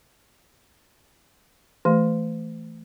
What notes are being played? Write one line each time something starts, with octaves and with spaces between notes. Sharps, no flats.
E3 A3